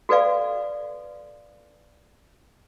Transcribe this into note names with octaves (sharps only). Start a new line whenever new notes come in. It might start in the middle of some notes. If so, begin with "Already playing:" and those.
F#4 A4 B4 D5 F5